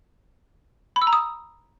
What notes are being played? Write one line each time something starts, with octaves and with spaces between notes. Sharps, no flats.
B5
E6
A#5
D#6